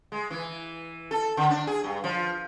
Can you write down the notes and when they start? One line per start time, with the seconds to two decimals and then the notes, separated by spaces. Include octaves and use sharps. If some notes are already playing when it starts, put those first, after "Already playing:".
0.12 G#3
0.30 E3
1.11 A4
1.37 D3
1.50 D4
1.67 G#4
1.84 G2
2.04 F3